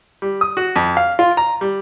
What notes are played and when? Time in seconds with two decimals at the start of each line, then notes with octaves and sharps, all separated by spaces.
0.22 G3
0.41 D#6
0.57 F#4
0.76 F2
0.97 F5
1.19 F4
1.37 A#5
1.61 G3